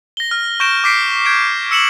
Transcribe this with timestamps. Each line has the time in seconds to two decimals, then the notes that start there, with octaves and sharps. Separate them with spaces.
0.17 A#6 G7
0.31 F6
0.60 C#6 G6 A#6 D7 E7
0.84 D6 G6 B6 C7 D7
1.25 G6 G#6 D7 E7
1.71 E6 C#7 E7 F#7